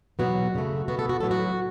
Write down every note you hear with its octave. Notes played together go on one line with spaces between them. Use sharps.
E2 B2 F#3 B3 F#4
F#2 C#3 A3
B2 B3 F#4
A4
F#4
A2 F#3 B3 A4
F#4